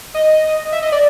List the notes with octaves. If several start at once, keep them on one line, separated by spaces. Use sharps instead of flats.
D#5
E5
D#5
D5